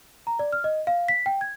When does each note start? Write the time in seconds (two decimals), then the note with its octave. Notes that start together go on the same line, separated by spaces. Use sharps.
0.27 A#5
0.39 D5
0.53 F6
0.64 D#5
0.87 F5
1.08 B6
1.26 G5
1.41 G#6